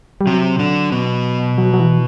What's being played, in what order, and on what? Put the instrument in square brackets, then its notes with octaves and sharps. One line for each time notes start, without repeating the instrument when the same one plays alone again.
[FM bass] G3
[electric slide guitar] C3 C4 [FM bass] F#3
[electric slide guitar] D3 D4
B2 B3
[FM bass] F#3
F#3
E3